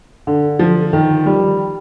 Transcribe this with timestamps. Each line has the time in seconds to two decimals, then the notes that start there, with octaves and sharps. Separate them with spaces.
0.27 D3
0.59 F3
0.93 D#3
1.26 G3